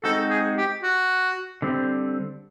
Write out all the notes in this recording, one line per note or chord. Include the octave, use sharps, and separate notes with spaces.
G#3 C4 D#4 F#4 A4
G#4
G4
F#4
D3 G3 C4